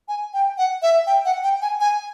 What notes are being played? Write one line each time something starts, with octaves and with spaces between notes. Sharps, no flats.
G#5
G5
F#5
E5
G5
F#5
G5
G#5
G#5